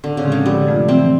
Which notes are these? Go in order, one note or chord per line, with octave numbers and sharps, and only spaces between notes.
A2 D3
C#3
F3 G#3 C4
D3
C3 G3
F3 A3 D4 F4
E3 C4